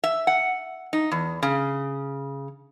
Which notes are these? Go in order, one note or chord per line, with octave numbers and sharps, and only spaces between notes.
E5
F#5
D#4
E2
C#3